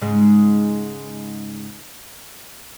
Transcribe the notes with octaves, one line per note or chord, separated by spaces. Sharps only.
G#2 C#3 G#3